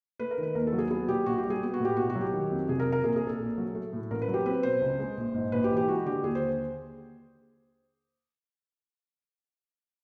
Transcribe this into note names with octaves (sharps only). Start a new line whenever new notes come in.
A3 B4
A#4
D#3
B4
D#2 A#4
A4
F#3
G#4
B3 G#4
A#2 G4
A#1 F#4
G4
G3
G#4
B3
F#4
A2 G4
B1 F#4
F#4
F#3
G4
D#3
F2
F1 G#4
A#4
C3
A#4
A#1 G#4
G#4
A#2
A4
A#1
F#3
A3
A2
A1 A#4
B4
F#3
G4
C4 B4
B2 C5
C#2
G#3
A#1
G#2
A#1 B4
G4
E3
G4
G#3 F#4
D3 G4
D#2 G#4
C5